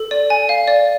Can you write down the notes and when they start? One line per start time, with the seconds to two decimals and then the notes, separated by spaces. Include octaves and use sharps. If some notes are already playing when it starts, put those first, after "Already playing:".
Already playing: A4
0.11 D5
0.30 G#5
0.49 F5
0.68 D5